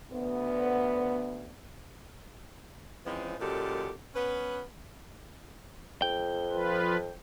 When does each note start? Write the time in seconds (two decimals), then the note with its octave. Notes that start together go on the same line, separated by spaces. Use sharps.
0.12 D2 B3
3.06 E3 F3 G#3 C4 C#4
3.40 F#2 A#2 G#3 G4 A4
4.15 B3 C#4 B4
6.02 F2 G5
6.50 F3 F4 B4